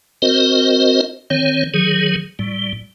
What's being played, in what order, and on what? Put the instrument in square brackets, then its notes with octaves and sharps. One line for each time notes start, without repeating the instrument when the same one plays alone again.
[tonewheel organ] C4 F#4 A#4 C5 D#5
D#3 C4 C#5
D#3 F#3 G#4
A2 G3